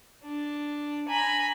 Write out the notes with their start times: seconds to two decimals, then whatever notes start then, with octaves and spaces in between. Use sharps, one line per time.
0.23 D4
1.08 G#5 A#5 B5